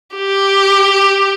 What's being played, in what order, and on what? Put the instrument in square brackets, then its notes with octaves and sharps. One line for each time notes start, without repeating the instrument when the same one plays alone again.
[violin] G4